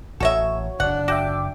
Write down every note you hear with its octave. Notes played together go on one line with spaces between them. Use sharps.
A1 F#4 A4 C#5 D#5 E5
F#1 D4 F#5
F#4 E5 G5 D6